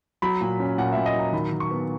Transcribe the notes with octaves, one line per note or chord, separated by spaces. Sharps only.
F#3 B5
A#2
C#4
A#2 F#5
A#2 E5
D#5
F#3 A#5
D#3 B5
D#3
C#6
B3